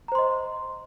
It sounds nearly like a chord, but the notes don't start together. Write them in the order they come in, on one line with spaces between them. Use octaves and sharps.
A#5 C5 C6 D#5